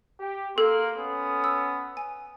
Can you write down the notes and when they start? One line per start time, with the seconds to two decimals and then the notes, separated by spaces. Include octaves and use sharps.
0.20 G4
0.58 A#3 A4 A#4 C6
0.97 B3 C#4 D#6
1.44 E6
1.97 G#5